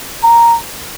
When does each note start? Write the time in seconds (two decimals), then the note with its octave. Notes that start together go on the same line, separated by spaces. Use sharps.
0.23 A#5